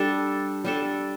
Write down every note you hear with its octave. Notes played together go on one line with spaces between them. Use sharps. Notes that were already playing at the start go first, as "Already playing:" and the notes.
Already playing: G3 D4 A4
G3 D4 A4